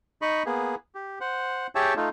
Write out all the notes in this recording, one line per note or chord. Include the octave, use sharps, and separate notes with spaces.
D#4 D#5 B5 C#6
A#3 B3 G#4
G4
C5 F#5
G4 G#4 C#5 E5 G5 A5
A3 D#4 F4